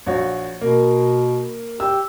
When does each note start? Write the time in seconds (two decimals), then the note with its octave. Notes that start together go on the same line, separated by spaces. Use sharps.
0.06 A#1 F#4 C#5
0.61 B2 A#3
1.80 G4 E6